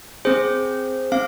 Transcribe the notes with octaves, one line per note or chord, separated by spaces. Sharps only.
C4 G#4 C5
C4 F5